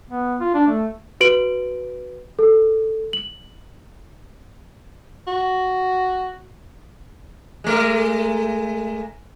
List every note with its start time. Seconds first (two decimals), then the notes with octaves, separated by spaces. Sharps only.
0.10 B3
0.41 F4
0.54 D4
0.67 A3
1.21 F#4 B4 D7 F#7
2.39 A4
3.13 F#7
5.27 F#4
7.64 G#3 A3 A#4